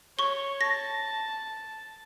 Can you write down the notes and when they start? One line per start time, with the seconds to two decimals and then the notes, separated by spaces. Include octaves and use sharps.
0.19 C#5 C#6 G7
0.61 A5 A#6